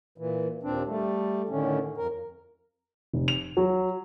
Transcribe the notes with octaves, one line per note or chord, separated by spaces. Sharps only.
A#2 E3
D#2 A#2 C4 D4
G3 A3
A2 D3 D#3 C#4
F2 A#4
F1
F7
F#3